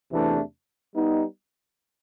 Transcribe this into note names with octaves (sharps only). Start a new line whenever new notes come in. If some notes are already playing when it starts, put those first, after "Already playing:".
E2 C3 E3 A3 D4
G3 B3 D#4